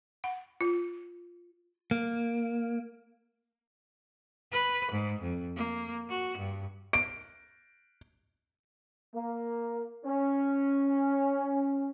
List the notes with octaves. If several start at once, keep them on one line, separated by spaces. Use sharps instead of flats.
F#5
F4
A#3
B4
G#2
F2
A#3
F#4
G2
D7
A#3
C#4